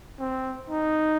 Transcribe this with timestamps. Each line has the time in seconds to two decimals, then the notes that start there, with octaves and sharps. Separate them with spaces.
0.19 C4
0.69 D#4